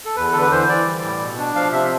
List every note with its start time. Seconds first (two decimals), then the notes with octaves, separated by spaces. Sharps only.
0.05 A4
0.16 E2 B4
0.32 D3 A4
0.42 B4
0.51 E3 C5
0.69 E3 D5
0.86 G3
1.03 A2
1.20 B2
1.38 D4
1.55 F3 F5
1.72 C3 E5